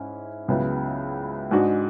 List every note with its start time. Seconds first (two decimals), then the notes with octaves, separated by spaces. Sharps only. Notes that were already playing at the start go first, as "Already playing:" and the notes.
Already playing: G#2 C#4 E4
0.48 C#2 C#3 F#3 B3 E4
1.51 G#2 G#3 D4 F#4